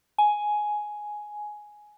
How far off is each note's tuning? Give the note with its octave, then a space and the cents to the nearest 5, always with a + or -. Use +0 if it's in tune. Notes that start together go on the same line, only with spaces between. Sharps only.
G#5 +10